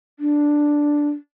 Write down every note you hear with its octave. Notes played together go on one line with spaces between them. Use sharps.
D4